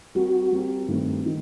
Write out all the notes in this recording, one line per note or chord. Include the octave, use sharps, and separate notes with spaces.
G3 C4 F#4 G4 A#4
G3 C4 G4 A#4
G2 D#3 A3 C4
D#3